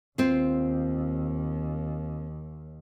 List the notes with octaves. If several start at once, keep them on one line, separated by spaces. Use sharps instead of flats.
D#2 C4 F4